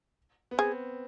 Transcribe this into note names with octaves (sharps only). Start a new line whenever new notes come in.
B3
C4 G#4